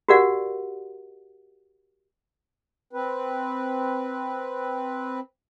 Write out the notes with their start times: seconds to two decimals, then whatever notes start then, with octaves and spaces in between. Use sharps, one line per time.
0.09 F#4 G4 A#4 D5 F5 F#5
2.93 C4 B4